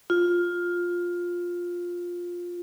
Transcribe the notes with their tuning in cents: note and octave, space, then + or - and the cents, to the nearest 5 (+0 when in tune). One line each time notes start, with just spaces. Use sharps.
F4 +10